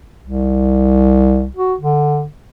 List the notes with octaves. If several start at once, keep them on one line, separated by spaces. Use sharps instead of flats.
C2
F#4
D3